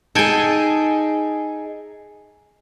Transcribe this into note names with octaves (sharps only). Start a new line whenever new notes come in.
D#4 G#4 A4 G5 G#5